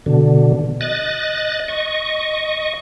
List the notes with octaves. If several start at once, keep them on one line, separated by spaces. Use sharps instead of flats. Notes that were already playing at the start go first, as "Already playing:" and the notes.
B2 D3
D#5 F#6 A6
D#5 C#6